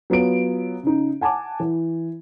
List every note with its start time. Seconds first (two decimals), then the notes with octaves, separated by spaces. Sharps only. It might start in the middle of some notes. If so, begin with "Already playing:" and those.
0.10 F#3 B3 F4 D7
0.83 C#3 D#4
1.21 F#5 G#5 A5 D6
1.60 E3